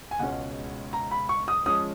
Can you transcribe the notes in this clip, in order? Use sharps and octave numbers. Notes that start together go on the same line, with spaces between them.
G#5
C#2 B2 G#3 C#4 F#5
A#5
B5
C#6
D#6
F3 G#3 C#4 D#6